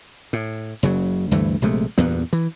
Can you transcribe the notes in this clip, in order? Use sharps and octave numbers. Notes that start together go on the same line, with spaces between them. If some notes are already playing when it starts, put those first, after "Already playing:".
A2
F#1 C#3 F#3
D2 G2 E3 A3
A#1 C3 G#3 A3
E2 G2 A#2 B3
E3